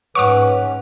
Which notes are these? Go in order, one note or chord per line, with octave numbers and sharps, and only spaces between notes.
G#2 C#4 B4 C#5 F#5 C#6 D6 F7